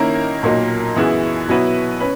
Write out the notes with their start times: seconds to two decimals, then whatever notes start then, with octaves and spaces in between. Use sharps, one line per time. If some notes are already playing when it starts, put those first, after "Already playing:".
Already playing: D#3 A#3 C#4 E4 A#4
0.42 B1 A#2 F#3 A#3 D#4
0.95 F#2 E3 B3 E4 G#4
1.48 B2 F#3 B3 E4 B4
2.00 C#4 B4